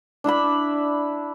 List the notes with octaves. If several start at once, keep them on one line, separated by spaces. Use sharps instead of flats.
D4 E4 E5 B5